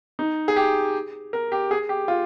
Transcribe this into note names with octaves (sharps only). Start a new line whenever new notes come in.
D#4
G#4
G4
A#4
G4
G#4
G4
F4